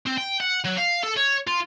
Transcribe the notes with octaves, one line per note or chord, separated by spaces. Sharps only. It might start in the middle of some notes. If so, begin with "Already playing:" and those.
C4
G5
F#5
F#3
F5
A4
C#5
F4